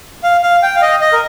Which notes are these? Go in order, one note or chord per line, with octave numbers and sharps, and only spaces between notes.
F5
F5
G5
F5
D#5
D#5
A#4